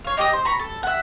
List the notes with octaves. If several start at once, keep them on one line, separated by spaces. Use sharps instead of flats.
C#5 F5
D#4 G4 D5 D#5
C5
A#5 B5 C#6
A4
E5 F#5